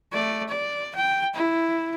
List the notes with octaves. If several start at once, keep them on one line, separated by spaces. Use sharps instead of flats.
A3 D5
D5
G5
E4